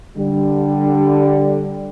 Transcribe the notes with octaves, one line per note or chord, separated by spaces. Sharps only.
D3 G3